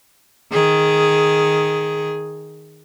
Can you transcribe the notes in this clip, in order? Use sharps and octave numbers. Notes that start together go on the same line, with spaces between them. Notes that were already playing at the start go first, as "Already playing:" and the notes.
D#3 G#4